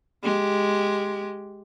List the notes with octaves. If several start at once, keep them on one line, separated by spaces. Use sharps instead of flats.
G#3 G4